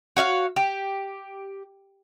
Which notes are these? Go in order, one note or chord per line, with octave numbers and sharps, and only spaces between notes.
F#4 C#5 E5 F5
G4